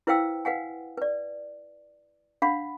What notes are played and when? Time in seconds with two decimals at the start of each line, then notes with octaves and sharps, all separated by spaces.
0.07 E4 B4 C5 F5 G5 E6
0.45 B4 F5 F#5 G#5
0.97 B4 D5
2.42 D4 F5 F#5 B5